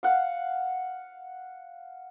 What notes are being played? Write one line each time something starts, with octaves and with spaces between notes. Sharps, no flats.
F5 F#5